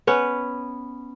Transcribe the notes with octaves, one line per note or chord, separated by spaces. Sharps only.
B3 C#4 B4